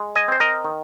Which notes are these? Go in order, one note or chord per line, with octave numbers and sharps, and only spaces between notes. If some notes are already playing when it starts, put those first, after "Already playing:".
Already playing: G#3
D#5 G#5
C4 C5
A#4 D#5
D#3